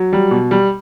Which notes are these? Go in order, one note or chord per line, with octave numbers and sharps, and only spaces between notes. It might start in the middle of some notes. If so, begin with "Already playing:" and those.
Already playing: F#3
G3
B2
G3